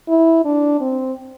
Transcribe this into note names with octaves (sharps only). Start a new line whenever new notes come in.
E4
D4
C4